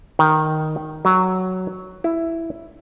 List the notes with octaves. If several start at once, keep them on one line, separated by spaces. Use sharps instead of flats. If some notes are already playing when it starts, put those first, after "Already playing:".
D#3
F#3
E4